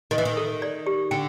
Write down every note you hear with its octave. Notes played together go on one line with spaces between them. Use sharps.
D#3 D#5
E3
D#3
A4
D5
G4
D3 G5